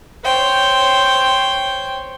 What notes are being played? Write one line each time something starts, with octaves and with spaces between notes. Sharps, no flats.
C5 C#5 G5